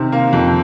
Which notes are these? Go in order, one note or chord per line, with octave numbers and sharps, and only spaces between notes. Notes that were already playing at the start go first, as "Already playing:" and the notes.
Already playing: C3 D#3
A#3
F2